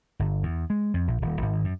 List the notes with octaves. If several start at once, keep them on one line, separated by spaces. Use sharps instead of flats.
G1
E2
G#3
F2
A#1
D#1
G#1
F#2